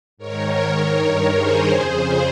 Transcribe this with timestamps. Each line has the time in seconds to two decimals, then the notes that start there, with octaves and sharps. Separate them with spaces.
0.17 G#2 D#3 A#4 C#5
0.93 G2 D#3 A#4 C#5
1.31 G#4 C5
1.69 F2 C#3 G#4 C5